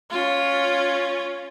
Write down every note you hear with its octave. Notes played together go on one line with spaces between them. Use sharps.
C#4 F4